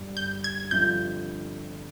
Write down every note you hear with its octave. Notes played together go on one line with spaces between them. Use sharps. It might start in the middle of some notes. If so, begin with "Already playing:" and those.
Already playing: G1 G2 G3
G6
G#6
G1 G2 F3 C4 F4 G6